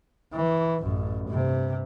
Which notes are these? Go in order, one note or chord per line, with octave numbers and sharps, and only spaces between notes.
E3
A1 F#2
G2 C3